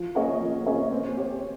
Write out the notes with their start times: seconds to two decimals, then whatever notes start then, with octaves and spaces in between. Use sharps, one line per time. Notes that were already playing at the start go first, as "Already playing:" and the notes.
Already playing: F3
0.15 A#3 C#4 G#4 D#5
0.41 F3
0.66 A#3 C#4 G#4 D#5
0.91 C4
1.17 G4 C#5